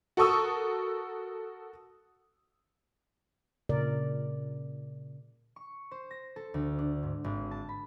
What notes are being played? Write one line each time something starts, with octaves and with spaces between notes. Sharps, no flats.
F#4 A4 A#4 C#6 D#6 E6
A#2 C#3 A#4 D5
C#6
C5
A#6
A4
D2
D4
G#2
G#1
A5
B5